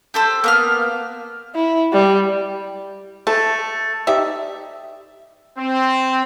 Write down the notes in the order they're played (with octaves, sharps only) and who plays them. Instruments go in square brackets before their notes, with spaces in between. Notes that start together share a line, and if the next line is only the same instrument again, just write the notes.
[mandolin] G4 A4 C5
A#3 B3 F6
[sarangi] E4
G3
[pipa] A3 [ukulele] A4
[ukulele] D#4 G4 D5 [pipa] E5
[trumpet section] C4